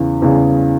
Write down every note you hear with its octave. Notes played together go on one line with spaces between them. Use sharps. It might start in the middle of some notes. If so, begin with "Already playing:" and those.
Already playing: E2 C#3 E3
E2 C#3 E3